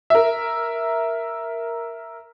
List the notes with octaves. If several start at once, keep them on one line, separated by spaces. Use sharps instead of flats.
A#4 E5